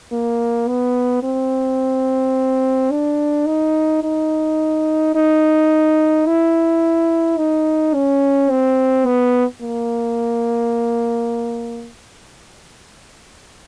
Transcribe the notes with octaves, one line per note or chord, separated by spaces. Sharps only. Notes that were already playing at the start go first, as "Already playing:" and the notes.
A#3
B3
C4
D4
D#4
D#4
D#4
E4
D#4
C#4
C4
B3
A#3